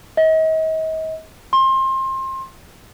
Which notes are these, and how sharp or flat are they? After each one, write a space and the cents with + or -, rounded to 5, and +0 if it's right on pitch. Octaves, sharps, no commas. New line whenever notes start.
D#5 +40
C6 +25